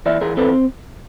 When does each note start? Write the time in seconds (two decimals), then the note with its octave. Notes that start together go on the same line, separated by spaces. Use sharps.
0.06 E3 D5 E5
0.21 E3 G#4 A#4
0.37 C4 A4 B4